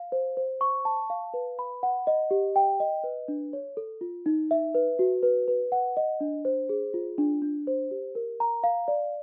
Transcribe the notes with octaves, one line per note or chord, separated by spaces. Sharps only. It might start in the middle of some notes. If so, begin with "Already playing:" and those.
Already playing: F5
C5
C5
C#6
A5
F5
B4
B5
F#5
D#5
G4
G5
D#5
B4
D4
C#5
A4
F4
D#4
E5
B4
F#4
B4
B4
F#5
D#5
D4
C5
G#4
F4
D4
D4
C5
G4
A#4
A#5
F5
D5